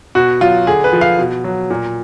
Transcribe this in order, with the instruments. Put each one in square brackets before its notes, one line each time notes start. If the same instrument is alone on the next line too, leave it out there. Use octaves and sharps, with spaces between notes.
[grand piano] B2 F#4
F#3 F4
D3 G#4
B4
F3
F5
B2
F#3
A#2